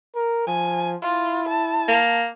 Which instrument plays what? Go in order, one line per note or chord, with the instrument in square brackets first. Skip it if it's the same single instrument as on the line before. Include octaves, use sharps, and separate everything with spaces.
[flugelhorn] A#4
[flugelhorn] F3 [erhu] G#5
[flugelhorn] E4 [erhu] F4
[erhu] A5
[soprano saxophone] A#3